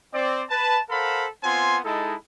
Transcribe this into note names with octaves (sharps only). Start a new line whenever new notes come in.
C4 D5
B4 A5
A4 A#4 C5 F5 F#5 B5
B3 C4 F4 G#5 C6
G#3 D#4 E4 A4